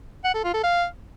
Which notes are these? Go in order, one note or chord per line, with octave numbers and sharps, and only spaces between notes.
F#5
A4
F4
A4
F5